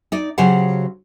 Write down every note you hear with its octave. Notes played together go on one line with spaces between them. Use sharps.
D#4 D5
C#3 F#3 G4 C5 C#5 F#5